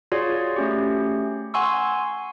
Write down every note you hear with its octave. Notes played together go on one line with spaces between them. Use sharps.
F4 F#4 G#4 C#5 D5
A3 C#4 G4
F#5 G#5 C6 C#6 E6